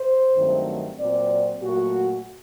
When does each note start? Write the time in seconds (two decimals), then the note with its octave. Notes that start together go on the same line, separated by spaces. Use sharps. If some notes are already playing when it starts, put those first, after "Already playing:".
Already playing: C5
0.36 G2 D#3 F#3 A3 C4
0.99 A#2 F#3 C4 D5
1.62 A#2 F#3 A3 F#4